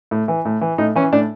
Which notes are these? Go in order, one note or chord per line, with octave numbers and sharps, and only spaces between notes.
A2
E3
A2
E3
A2 D#4
E3 C#4
A2 D4